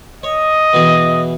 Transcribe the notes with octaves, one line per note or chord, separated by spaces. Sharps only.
C#5 D#5
B2 E3 G#4